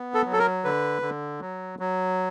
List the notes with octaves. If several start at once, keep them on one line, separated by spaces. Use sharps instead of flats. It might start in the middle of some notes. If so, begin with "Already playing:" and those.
Already playing: B3
A4
F#3
A4
A#4
D3 B4
D3
F#3
F#3